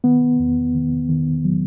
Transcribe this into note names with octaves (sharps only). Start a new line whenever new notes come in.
D#3 B3
E2
D#3
D#3
F#3